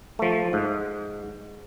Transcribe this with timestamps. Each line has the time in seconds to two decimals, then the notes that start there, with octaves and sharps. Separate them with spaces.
0.19 F3 A3
0.53 G#2